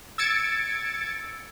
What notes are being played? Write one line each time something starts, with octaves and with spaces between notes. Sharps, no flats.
E6 G#6 A6 C#7 D7